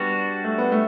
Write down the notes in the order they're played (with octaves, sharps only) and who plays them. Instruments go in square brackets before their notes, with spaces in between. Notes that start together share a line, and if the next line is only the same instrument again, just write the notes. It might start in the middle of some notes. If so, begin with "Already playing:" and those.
Already playing: [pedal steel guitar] G3 D4 F#4 [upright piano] B3
[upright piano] A3
B3
A3